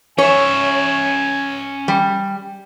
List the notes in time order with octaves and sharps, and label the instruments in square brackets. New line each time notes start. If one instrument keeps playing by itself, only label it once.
[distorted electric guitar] C#4 E5 [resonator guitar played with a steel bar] C#5 [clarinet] G#5
[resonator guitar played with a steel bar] G3